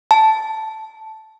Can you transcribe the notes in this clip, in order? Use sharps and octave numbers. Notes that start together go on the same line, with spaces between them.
A5